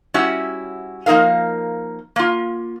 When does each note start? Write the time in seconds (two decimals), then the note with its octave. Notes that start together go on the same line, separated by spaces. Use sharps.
0.14 G3 C#4 E4 F#4 G4 E5
1.06 F3 A#3 D#4 A#4 F5
2.16 A#3 F4